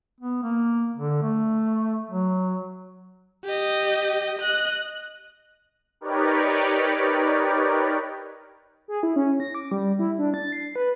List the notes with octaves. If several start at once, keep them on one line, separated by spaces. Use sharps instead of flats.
B3
A#3
D3
A3
F#3
G4 D#5
D#5 F#6
D#4 G4 A#4 B4 C#5 D5
G#4
E4
C#4
A#6
D6
G3
E4
D4
A6
C7
B4